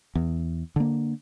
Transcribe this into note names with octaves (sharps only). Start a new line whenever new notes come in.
E2
D3 A#3